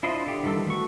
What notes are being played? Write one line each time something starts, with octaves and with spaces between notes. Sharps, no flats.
D4 E4 F4 C5 D#5
D3 G4
D#3 E3 G3 A4 E6
A3 F#4 C#6